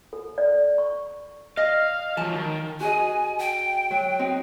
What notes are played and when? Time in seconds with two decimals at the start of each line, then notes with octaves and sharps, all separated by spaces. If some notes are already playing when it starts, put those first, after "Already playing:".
0.13 A4
0.38 D5
0.78 C#6
1.57 D#5 F5
2.17 F3 F#3 A5
2.33 D#3
2.80 F#4 G#4 D#5 G#5
3.39 G5
3.91 F#3
4.19 C4 D#4 F#4